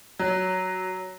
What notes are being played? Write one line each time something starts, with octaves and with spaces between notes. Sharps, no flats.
F#3